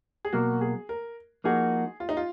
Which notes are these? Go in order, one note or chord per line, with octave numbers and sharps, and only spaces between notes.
G#4
B2 F#3 A#3 F#4
G#4
A#4
F3 A#3 D#4 F#4 G#4
F4
D#4
F4